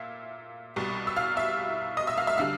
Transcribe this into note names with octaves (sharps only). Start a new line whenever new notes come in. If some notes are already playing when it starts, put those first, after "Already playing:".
Already playing: A#2 E5 F5
C2 B2 G3
E6
F5 F6
E5 E6
D#5 D#6
E5 E6
F5 F6
E5 E6
D3 G3 F5 F6